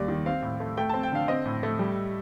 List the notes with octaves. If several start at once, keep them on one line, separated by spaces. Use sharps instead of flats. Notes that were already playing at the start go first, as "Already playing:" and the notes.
Already playing: D#2 G3 D5
D#3
C4 F5
A2
A3
A3 G5
A5
C4
G5
D3 F5
C4 D#5
A2
A3
G3